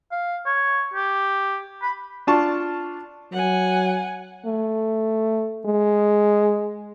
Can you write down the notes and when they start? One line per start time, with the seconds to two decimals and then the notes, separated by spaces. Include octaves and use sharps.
0.12 F5
0.46 C#5
0.94 G4
1.83 B5
2.27 D4 F4 A5 C#6
3.32 F#3 F#5 G#5
4.46 A3
5.66 G#3